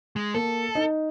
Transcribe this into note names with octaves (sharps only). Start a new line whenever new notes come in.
G#3
A#3 A4
D#4